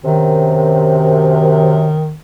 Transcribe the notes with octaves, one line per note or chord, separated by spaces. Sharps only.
F#2 C3 D#3